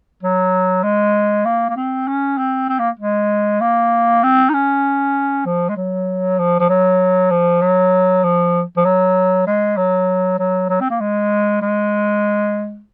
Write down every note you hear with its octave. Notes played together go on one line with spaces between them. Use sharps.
F#3
G#3
A#3
A#3
C4
C#4
C4
C4
A#3
G#3
A#3
C4
D#4
C#4
F3
G#3
F#3
F3
F3
F#3
F3
F#3
F3
F3
F#3
G#3
F#3
F#3
F#3
C4
A#3
G#3
G#3